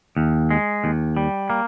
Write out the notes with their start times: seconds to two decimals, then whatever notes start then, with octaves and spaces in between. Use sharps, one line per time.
0.17 D#2
0.51 G#3
0.84 D#2
1.17 G3
1.50 A#3